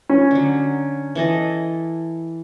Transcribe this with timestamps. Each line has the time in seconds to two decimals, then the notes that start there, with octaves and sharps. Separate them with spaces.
0.09 C#4
0.31 D3 F#3
1.15 E3 A4 D#5